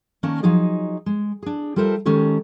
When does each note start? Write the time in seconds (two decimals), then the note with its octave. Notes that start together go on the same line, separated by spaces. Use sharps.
0.23 D#3 A#3 C#4 A#4 D5 A5
0.43 F3 F#3 D#4 G#4 D#5
1.06 G#3
1.43 D4 G#4
1.76 G3 F4 A4 A#4 C5 E5
2.05 D#3 G#3 C#4 G4 A4